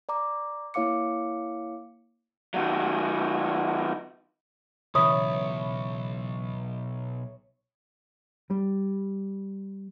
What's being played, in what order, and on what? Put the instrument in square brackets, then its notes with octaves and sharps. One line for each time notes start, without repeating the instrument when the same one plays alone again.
[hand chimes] D5 A#5 D6
A#3 E4 C#5 F5 D6 C#7
[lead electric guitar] D#3 F#3
[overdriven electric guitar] B1 [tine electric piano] C#3 E3 [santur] C#5 E5 B5 [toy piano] D#6
[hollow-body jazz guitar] G3